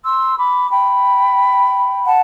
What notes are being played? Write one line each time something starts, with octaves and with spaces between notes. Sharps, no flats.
C6 E6
B5 D6
G5 B5
F#5 A5